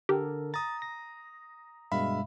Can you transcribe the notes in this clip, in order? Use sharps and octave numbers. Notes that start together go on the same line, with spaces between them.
D3 G4 A4 A#4
A#5 D#6 A6
A#6
G2 B2 G#3 E5 F5 B5